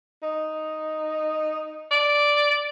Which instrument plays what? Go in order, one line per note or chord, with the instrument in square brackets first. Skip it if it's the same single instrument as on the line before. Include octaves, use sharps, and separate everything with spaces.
[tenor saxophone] D#4
D5